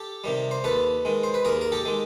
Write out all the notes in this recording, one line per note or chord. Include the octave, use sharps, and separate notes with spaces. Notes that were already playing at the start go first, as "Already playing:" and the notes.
Already playing: G4 A4
C3 D#3 G3
C5
D#2 A4 B4
D#3 G#3
C5
B4
D#2 G#4 A#4
A#4
G4 A4
D#3 G#3